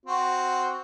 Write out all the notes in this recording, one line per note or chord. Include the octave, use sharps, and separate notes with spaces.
C4 F#4